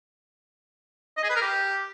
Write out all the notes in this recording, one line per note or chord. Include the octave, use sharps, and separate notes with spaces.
D#5
G#4
B4
A#4
G4